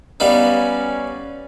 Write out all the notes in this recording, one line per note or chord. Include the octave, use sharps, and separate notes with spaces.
G3 B3 C#4 D#4 B4 D5 F5